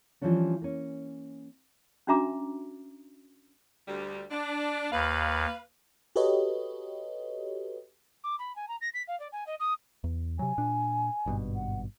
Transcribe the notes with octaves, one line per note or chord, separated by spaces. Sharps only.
E3 F3 G3 C#4 D4
A#3 C#4
C#4 D4 F#4 E5 A#5 D6
D2 G3
D4
D#2 B4 F5
F#4 G4 A4 B4 C#5 D#5
D6
B5
G#5
A#5
A#6
B6
F5
D5
G#5
D#5
D#6
E2
C3 F#3 G#5
A#2 D4
G#1 G2 B2
F#5